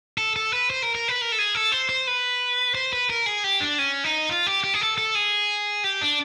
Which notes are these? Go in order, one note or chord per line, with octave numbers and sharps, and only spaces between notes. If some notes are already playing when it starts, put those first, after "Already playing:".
A4
A4
B4
C5
A#4
A#4
B4
A#4
A4
G#4
A4
C5
C5
B4
C5
B4
A#4
G#4
G4
D4
C#4
D#4
F4
G4
G4
G#4
A4
A4
G#4
G4
D4